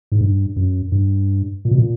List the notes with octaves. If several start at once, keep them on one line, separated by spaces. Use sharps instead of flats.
G#2
G2
F#2
G2
A#2
B2
A#2